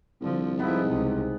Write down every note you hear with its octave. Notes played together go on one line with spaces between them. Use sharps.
C2 D3 F3
G#2 F3 B3 E4
C#2 C3